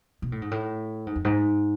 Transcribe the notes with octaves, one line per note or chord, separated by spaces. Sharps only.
B2
A2
G#2
A2
G#2
F2
G#2